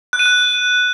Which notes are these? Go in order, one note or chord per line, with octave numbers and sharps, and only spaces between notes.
F#6
D#7
F#6